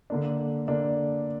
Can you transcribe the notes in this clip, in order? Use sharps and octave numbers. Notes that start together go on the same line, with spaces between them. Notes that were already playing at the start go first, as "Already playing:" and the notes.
D3 A#3 D4
D3 A#3 D4